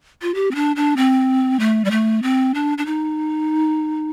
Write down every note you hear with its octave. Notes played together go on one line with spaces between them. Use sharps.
F4
G4
C4
D4
D4
C4
A3
G3
A3
C4
D4
D4
D#4